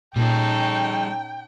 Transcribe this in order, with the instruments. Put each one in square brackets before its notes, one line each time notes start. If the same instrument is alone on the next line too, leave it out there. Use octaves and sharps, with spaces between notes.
[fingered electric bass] A#2 [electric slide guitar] G3 G#4 [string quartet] C#4 D#4 A4 [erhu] G5